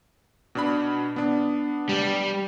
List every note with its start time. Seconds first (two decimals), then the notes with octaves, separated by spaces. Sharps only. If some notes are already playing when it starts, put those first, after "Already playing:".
0.55 B2 D4 B5
1.16 B3 D4
1.89 G3